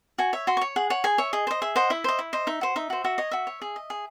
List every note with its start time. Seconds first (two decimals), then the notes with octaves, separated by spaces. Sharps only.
0.18 F#4 G#5
0.33 C#5 E5
0.47 F#4 C6
0.57 C#6
0.61 C#5
0.76 G#4 F#5
0.90 C#5 F#5
1.04 G#4 G#5
1.18 C#5 E5
1.33 G#4 D#5
1.47 C5 D#5
1.62 G#4 E5
1.76 C5 D#5 F#5
1.90 E4 E5
2.04 C5 D#5
2.19 E4
2.33 C5 D#5
2.47 D#4 E5
2.61 F#4 C5
2.76 D#4 E5
2.90 F#4 C5
3.04 F#4 E5
3.18 C#5 D#5
3.31 F#4 E5
3.47 C#5
3.62 G#4
3.76 D#5
3.90 G#4